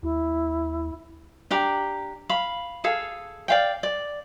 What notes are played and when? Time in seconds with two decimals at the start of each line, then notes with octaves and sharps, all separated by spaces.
0.03 D#2 E4
1.51 D4 G4 A#5
2.29 F5 B5
2.84 G#4 A4 F5
3.48 D5 F5 G5
3.83 D5